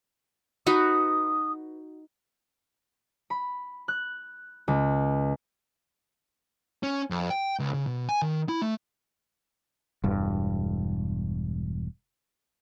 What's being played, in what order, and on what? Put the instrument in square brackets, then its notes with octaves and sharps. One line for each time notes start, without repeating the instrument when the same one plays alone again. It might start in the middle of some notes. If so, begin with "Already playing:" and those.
[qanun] D#4 F#4 B4 [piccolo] D#6
[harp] B5
F#6
C#2
[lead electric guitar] C#4
F2
G5
C#2
C#3
B2
G#5
D#3
E4
A3
[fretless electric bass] E1 G2